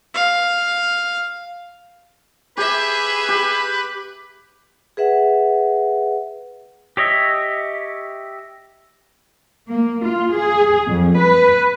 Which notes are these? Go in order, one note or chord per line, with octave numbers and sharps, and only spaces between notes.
F5
G4 G#4 B4 E5
G4
G#4 B4 E5 F#5
G4 C#5 D#5 E5
A#3
F4
G#4
F2
B4